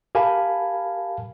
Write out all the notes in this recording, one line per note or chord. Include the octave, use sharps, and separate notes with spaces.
G4 A#4 F5 G#5 A5 B5